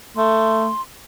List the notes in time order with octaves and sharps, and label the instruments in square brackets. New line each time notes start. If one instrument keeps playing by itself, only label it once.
[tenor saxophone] A3 [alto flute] C6